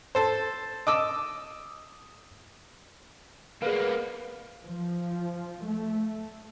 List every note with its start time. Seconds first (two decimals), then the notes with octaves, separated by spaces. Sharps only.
0.15 A4 C5
0.87 D#5 D6 E6
3.62 A#3 B3 G#4 F5
4.65 F3
5.65 A3